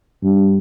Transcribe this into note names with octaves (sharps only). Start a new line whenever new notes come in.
G2